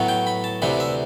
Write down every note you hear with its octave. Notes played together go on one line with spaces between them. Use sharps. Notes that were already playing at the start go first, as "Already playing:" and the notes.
Already playing: A2 F#3 B3
G5
B5
A5
D2 C3 E3 G3 C4 B5
E5